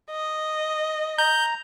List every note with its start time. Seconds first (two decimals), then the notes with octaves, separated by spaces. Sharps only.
0.11 D#5
1.18 A#5 G6